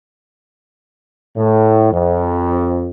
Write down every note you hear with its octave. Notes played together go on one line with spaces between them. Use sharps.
A2
F2